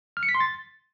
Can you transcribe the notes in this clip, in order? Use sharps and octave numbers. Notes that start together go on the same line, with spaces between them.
F6
C#7
B6
C6
A6